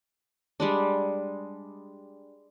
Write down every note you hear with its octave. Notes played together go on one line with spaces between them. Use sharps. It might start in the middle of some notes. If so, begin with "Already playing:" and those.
G3 G#3 D4